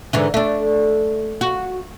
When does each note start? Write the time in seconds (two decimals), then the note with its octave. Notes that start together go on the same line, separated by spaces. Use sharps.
0.13 G#2 D3 E3
0.34 A3 D4
1.41 F#4